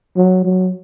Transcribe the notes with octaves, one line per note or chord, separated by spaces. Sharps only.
F#3
F#3